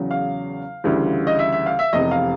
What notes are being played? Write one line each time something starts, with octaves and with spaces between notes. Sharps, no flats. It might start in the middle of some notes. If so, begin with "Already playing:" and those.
Already playing: E2 C#3 F#3
F5
D2 C#3 E3 G3
D#5
E5
E5
F5
E5
F1 E2 C3 D#5
F5